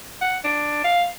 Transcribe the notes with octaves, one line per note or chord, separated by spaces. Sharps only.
F#5
D4
F5